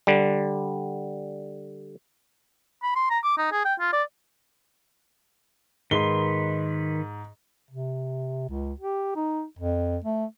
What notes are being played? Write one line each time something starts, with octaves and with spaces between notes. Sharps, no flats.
D3 G3
B5
C6
A#5
D6
D#4
G#4
G5
F4
D5
G#2 D#3 B4 C6 G7
C3
C#2
G4
D#4
F2
A3